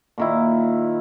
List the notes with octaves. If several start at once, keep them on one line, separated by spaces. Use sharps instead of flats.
A#2 D#3 E4